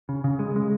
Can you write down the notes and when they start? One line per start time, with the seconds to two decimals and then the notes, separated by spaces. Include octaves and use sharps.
0.09 C#3
0.24 C#3
0.39 G#3
0.56 G#3